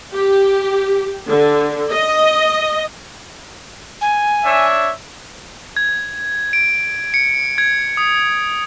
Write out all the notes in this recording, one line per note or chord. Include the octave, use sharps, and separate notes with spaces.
G4
D3
D#5
G#5
D4 C#5 E5
G#6
D7
C#7
G#6
D#6